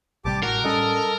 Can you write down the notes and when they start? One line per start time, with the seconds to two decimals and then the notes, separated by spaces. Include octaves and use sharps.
0.25 A1 C3 G3 G4 A5 D6
0.43 A2 F#4 A#4
0.64 A2 G3 C#4 A4 D#5